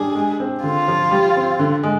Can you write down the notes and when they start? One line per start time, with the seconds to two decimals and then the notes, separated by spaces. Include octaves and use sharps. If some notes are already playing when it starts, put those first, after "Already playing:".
Already playing: G3 D4 G#4
0.15 G#3
0.40 C4
0.63 D3 F4
0.88 F3
1.11 G3
1.36 C4
1.59 D3
1.83 G#3